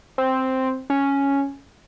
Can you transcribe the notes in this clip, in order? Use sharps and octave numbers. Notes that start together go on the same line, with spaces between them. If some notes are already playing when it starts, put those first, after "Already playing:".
C4
C#4